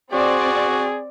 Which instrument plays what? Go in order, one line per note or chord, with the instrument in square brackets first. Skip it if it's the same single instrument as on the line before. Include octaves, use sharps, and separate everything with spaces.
[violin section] C4 D5 [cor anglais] F#4 [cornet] G#4